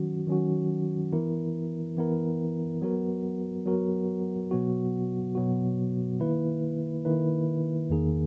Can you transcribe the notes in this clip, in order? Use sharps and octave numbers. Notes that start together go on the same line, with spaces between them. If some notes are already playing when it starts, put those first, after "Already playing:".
Already playing: D#3 F#3 C#4 F#4
D#3 F#3 C#4 F#4
E3 B3 E4 A#4
E3 B3 E4 A#4
F#3 B3 F#4 A#4
F#3 B3 F#4 A#4
B2 F#3 B3 F#4
B2 F#3 B3 F#4
D#3 A#3 E4 B4
D#3 A#3 E4 B4
E2 D#3 A#3 D#4 G#4